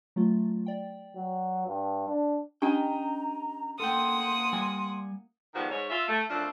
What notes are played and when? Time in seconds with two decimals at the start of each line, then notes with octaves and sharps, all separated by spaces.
0.16 F#3 A3 F4
0.66 D5 G5
1.16 F#3
1.67 G2
2.08 D4
2.62 C#4 D4 G4 D#5 G5 A#5
3.80 A#3 A4 F#5 G5 C6 D#6
4.53 G3 G#5
5.54 G#2 D#3 F3 G3 B3 F#4
5.70 G#2 C#5
5.90 F4 E5
6.08 A3
6.30 F#2 F3 A3 C4 D4